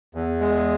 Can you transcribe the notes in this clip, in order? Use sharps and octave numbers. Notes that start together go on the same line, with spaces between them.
E2
G#3